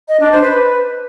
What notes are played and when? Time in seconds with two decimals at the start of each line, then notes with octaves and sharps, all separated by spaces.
0.08 D#5
0.20 D4
0.31 C5
0.42 B4